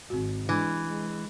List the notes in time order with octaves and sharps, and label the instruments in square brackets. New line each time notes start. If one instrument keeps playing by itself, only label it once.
[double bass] G#1 [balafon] C4 F#4
[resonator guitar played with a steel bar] E3 [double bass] G#3 [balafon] D4
[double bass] G#3